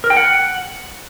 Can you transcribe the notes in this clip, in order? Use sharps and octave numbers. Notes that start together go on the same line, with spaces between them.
A#4
G5
F#5